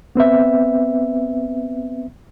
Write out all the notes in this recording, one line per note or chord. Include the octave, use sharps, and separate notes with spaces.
B3 C4 B4 E5